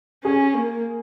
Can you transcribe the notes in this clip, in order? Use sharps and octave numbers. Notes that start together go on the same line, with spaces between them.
C#4 G#4
A#3